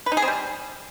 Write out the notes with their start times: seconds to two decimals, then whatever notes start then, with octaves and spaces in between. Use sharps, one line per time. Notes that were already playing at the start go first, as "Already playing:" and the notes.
0.06 B4
0.12 D#4
0.17 G#4
0.22 C4
0.28 G3